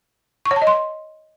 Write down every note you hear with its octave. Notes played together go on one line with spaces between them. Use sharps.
C#6
C#5
A5
D#5
C6